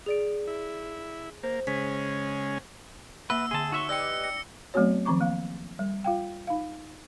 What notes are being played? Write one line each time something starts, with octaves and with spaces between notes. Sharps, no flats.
G#4 D5 D7
E4
A#3 C5
C#3 G#3 C#4 B6
A#3 B4 E5 F#5 E6
D3 G#4 A5 C6
D#4 F#4 E5 C#6
G4 B4 D5 D#5 G5 D6 E6 C#7
A#6 C#7
F#3 A3 B3 C4 F#4 C#5
D#3 F3 C4 A#5 C#6 D6
A#3 F5
G3
F4 F5 G5
D#4 F5